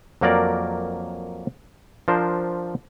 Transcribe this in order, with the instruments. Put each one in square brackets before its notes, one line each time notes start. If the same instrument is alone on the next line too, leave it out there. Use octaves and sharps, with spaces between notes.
[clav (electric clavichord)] F2 F#3 A#3 A#4 D5
F3 D4 A#4 C5